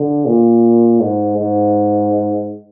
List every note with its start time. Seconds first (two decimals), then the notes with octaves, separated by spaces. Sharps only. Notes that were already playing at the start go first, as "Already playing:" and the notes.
Already playing: D3
0.26 A#2
1.01 G#2
1.38 G#2